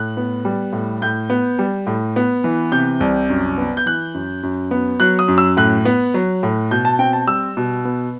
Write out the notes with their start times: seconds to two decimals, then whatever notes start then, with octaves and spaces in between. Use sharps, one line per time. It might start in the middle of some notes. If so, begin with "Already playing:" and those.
Already playing: A2 F#6
0.17 B3
0.45 G3
0.73 A2
1.02 A2 G6
1.30 B3
1.59 G3
1.87 A2
2.16 B3
2.44 E3
2.72 C3 G6
3.00 C2
3.29 F#2
3.58 B3
3.77 G6
3.86 E3 F#6
4.14 F#2
4.43 F#2
4.71 B3
5.00 F#3 F#6
5.19 D#6
5.28 F#2
5.38 E6
5.57 A2 F#6
5.85 B3
6.14 F#3
6.43 A2
6.71 B2 G6
6.85 A5
6.99 C4 G5
7.13 A5
7.27 G3 E6
7.57 B2
7.85 B3